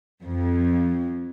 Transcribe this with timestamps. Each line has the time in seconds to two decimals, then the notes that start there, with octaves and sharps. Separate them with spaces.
0.25 F2